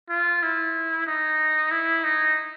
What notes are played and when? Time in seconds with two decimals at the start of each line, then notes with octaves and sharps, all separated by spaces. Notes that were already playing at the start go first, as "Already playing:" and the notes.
0.10 F4
0.42 E4
1.07 D#4
1.71 E4
2.04 D#4